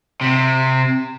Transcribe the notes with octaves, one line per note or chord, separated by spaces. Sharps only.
C3